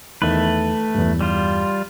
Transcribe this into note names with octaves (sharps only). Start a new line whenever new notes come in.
E2 D#3 A3 B4
E2 G2
G3 F4